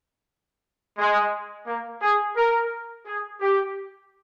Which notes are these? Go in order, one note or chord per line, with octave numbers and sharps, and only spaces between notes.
G#3
A#3
G#4
A#4
G#4
G4